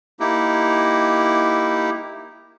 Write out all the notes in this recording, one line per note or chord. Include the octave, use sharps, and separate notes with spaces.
A#3 D#4 E4 G4